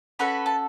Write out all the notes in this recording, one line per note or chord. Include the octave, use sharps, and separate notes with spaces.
C#4 F#4 A4 B4 B5
A5